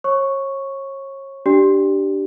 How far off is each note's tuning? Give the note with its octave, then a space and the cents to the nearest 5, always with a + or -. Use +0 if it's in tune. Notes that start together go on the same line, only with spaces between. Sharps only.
C#5 -35 C#6 +0
D4 +0 G4 -15 D5 +0